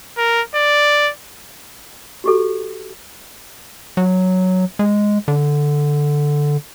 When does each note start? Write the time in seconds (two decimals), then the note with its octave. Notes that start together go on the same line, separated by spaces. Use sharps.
0.18 A#4
0.55 D5
2.24 F#4 G4 A4
3.97 F#3
4.79 G#3
5.28 D3